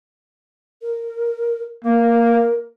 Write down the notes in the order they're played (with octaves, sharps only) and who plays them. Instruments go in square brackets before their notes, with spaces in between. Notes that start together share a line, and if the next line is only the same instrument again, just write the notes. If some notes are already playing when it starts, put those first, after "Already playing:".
[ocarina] A#4
[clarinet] A#3 [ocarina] A#4